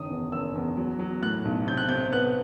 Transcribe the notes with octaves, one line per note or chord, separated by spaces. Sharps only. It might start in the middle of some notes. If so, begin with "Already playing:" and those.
Already playing: F#1 D#3 D#6
E2
F#1 E6
E2
F#3
F#3
A2 F#6
B1
C3 G6
F#6
C3 G6
B3 F#6